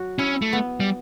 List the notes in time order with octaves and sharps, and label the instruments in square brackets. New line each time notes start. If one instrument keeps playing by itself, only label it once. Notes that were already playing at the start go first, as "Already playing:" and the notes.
Already playing: [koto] F#3 F#4
[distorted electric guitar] C#4 [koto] E4
[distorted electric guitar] A3
[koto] B3
[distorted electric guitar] G3